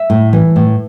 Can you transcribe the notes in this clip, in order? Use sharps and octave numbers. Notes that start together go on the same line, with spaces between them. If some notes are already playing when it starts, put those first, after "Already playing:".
Already playing: E5
A2
E3
A2